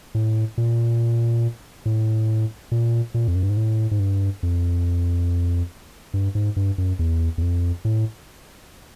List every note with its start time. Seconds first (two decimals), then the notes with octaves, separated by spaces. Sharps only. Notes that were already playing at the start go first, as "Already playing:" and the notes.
0.15 A2
0.58 A#2
1.86 A2
2.72 A#2
3.14 A#2
3.28 F2
3.35 F#2
3.43 G2
3.50 G#2
3.57 A2
3.91 G#2
4.00 G2
4.43 F2
6.14 G2
6.35 G#2
6.56 G2
6.78 F#2
6.99 E2
7.38 E2
7.42 F2
7.85 A2